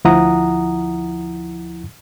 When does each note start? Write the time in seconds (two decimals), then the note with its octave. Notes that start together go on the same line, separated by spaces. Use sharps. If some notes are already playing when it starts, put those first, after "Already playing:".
0.05 D2 F3 E4 F#5 A#5 D#6